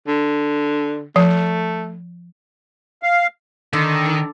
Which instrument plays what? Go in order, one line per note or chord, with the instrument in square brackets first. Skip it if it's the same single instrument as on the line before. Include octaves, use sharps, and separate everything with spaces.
[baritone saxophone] D3
[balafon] F3 [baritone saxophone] A3
[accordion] F5
[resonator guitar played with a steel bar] D3 [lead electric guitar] D#3